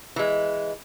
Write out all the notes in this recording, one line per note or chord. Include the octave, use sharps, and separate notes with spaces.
E3 G#3